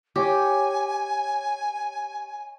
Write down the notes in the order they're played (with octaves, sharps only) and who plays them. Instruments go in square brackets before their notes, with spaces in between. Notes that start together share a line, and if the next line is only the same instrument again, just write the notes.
[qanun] G4 [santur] C#5 D#5 [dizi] G#5